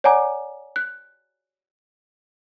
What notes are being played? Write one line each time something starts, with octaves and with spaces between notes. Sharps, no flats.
C#5 D5 F#5 G#5 A#5 D6
F#6